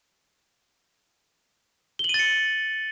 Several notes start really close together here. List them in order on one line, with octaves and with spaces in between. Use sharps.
G7 F#7 D#7 A6 C#7